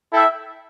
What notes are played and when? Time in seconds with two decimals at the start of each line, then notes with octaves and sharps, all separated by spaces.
0.13 E4 A4 E5 G5